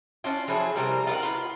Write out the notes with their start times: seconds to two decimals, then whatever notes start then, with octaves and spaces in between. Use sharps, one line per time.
0.24 C#4 D4 F4
0.48 F3 F#3 E4 G#4
0.75 C3 G3 A#4
1.07 F4 A#4 F#5
1.23 B3 F4